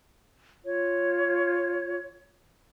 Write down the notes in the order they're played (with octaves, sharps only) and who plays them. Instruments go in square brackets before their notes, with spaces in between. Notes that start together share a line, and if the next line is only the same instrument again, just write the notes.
[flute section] F4 C#5